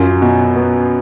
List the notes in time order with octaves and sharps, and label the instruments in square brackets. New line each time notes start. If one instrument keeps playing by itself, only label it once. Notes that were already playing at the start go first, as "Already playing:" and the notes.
Already playing: [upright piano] F#2 [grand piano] F4
[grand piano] B2
B3